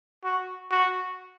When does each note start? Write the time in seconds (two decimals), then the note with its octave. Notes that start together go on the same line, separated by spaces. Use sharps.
0.24 F#4
0.71 F#4